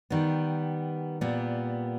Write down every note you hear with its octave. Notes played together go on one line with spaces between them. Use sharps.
D#3 G3 B3
A#2 G3 B3